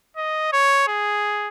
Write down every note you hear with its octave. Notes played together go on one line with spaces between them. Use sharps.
D#5
C#5
G#4